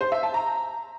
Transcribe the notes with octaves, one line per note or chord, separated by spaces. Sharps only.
C5
E5
A5
A#5